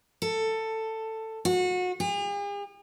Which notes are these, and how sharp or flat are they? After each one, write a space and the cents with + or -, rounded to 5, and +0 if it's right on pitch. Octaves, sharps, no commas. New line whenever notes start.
A4 +15
F#4 -30
G#4 -45